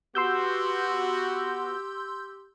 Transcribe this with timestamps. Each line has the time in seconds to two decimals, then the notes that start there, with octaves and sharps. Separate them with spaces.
0.15 B3 F#4 G4 C6 E6 G6